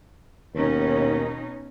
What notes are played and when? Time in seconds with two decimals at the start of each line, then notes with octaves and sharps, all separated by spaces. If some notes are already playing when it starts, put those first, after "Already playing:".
0.55 D#2 B2 C#4 D#4